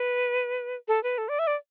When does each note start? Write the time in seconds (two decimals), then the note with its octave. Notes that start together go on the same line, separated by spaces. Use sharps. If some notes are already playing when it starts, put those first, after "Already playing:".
Already playing: B4
0.88 A4
1.04 B4
1.18 A4
1.29 D5
1.39 E5
1.47 D5